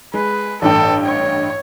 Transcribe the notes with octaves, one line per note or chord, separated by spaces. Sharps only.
G#3 B4
A1 G2 A4 G5
C#5